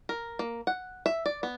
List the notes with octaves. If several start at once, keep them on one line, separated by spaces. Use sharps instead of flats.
A#4
A#3
F#5
E5
D5
B3